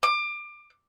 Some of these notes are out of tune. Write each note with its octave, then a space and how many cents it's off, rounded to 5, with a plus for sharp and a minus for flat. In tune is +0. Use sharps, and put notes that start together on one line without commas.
D6 +25